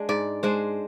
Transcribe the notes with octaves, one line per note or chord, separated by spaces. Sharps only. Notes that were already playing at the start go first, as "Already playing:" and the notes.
Already playing: G#3 D4
G#2 D5
G#3 D4 C5